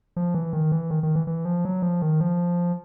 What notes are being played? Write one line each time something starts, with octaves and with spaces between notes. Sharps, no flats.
F3
E3
D#3
E3
D#3
D#3
E3
E3
F3
F#3
F3
D#3
F3